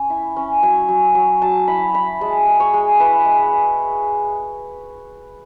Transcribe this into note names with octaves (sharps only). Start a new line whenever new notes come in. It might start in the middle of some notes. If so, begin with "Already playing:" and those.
Already playing: C#4
E4
C#4
F#3 G#5
F#3
F#3
F#3 A5
E4 B5
E4 B5
G#3 A5
G#3
C#5
G#3
E4 B4
G#3